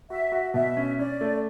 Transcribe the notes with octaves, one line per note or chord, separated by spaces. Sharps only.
F#4 E5
F#4
B2 E5
C#4
C#4 D5
A3